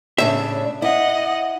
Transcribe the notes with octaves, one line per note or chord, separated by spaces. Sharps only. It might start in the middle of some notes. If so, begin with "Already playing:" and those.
A2 C#3 D4 E5
E4 D#5 F#5